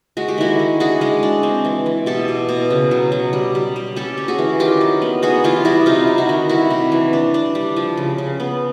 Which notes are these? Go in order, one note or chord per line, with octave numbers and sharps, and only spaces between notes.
G#3 F#4
G4
D#3 E4 F#4
G#3
D4 F#4 G#4
G#3
D4
C4
E3
E3
B2 G4 A4
B2
B2
C#3
F#3
F#3
G3
G3
G3
C#4 G4 A4
C#4
F#4 G#4
E3
D#3 F4 G4
F#3
B3
B3 F#4 G#4
E3 F4 G4
G3 E4 F#4
C3 D#4 F4
C3
E4 F#4
D#3
G3 E4 F#4
C3
E3
D4
D4
G3
F3
C#3
C#3
B3